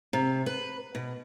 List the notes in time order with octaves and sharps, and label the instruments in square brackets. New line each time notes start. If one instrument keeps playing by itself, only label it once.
[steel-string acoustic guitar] C3
B4
B2